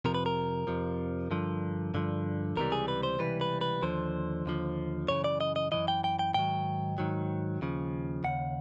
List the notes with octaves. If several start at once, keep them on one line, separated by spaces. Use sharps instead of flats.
F2 C3 F3 A#4
B4
A#4
F2 C3 F3
G2 D3 F3
G2 D3 F3
C#2 C3 E3 G3 A#4
G#4
B4
C5
C#2 C3 E3 G3 B4
B4
B4
D#2 D3 F3 C5
D#2 D3 F3
F#2 C#3 E3 C#5
D5
D#5
D#5
F#2 C#3 E3 D#5
G5
G5
G5
G#2 D#3 F#3 G5
G#2 D#3 F#3
D#2 C#3 F3
D#2 C#3 F#5